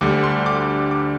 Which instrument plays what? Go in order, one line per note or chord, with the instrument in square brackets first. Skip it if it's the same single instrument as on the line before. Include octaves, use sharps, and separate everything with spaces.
[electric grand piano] D2 D3 G3 D6
C6
D6
D6